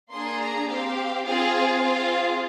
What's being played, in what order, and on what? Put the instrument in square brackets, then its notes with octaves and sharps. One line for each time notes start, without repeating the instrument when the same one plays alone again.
[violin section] A#3 D4 G#4 C6
A#5
C4 G4 F5
C4 F4 G#4 F5
F5
C4 F4 G#4